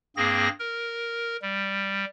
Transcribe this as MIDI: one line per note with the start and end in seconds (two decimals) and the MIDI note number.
0.17 0.49 43
0.17 0.49 58
0.17 0.49 60
0.17 0.49 68
0.17 0.49 94
0.59 1.37 70
1.42 2.05 55